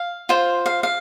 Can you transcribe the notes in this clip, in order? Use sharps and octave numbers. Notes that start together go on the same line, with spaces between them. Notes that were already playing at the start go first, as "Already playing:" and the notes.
Already playing: F5
F4 C5
F5
F5